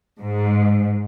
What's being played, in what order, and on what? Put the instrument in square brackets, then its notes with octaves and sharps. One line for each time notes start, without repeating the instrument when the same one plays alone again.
[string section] G#2